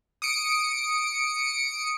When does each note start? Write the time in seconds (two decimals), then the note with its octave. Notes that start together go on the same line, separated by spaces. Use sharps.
0.22 D#6 C#7 D7